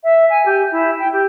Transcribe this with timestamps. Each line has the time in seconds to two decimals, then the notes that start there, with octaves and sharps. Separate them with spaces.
0.03 E5
0.29 G#5
0.45 G4
0.71 E4
0.99 G5
1.13 G4